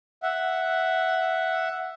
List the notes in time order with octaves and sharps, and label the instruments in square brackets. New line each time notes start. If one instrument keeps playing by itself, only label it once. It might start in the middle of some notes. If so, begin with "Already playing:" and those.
[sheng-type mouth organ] E5 F#5